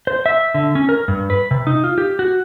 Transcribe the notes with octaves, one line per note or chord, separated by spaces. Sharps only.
C5
E5
D3
C#4
A#4
G2
B4
C3
D#4
F4
G4
F#4